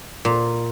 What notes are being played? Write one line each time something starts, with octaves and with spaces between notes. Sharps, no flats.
A#2